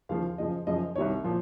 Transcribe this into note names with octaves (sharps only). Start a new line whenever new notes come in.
D#2 C#3 F3 F5
F#2 C#3 F3 D#5
F#2 C#3 F3 D#5
C2 C3 D#3 C#5
A#2 F3